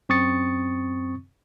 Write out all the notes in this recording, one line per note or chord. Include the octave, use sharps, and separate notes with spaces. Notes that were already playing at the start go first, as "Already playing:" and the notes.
F#2 C4 C#6 D#6 A6 C#7